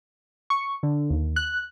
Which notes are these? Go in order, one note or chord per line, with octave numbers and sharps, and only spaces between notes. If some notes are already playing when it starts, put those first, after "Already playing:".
C#6
D3
D#2
F#6